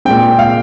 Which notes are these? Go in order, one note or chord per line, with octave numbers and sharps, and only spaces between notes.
A#2 G#3 C4 G5
F5